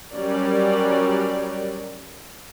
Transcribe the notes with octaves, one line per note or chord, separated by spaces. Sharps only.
F#3 G3 C#4 A#4 D5